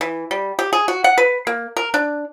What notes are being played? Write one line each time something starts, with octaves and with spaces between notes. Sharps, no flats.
E3
G3
G4
G#4
F#4
F#5
B4
A#3
A#4
D4